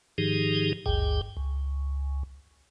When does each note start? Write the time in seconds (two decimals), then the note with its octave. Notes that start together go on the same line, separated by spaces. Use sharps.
0.18 G#2 D#3 F3 D#4 G4 G#4
0.86 G#1 D2 G2 G#4 G5
1.37 C#2